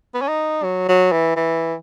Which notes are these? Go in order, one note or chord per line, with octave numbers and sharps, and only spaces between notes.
B3
C#4
D#4
F#3
F#3
E3
E3